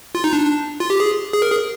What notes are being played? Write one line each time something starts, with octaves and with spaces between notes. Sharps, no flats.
F4
D#4
D4
F4
G4
G#4
G#4
A#4
G#4